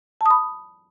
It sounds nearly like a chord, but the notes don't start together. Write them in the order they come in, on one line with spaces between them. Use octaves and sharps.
A5 D#6 B5